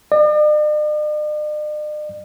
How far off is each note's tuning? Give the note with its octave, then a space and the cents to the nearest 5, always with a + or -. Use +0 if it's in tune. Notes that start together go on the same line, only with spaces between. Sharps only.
D5 +45